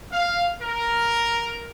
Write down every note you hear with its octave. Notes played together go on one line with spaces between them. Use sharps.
F5
A#4